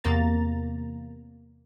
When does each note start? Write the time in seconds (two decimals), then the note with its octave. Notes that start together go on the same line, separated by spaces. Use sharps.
0.04 E2 C3 A#3 A#5 A6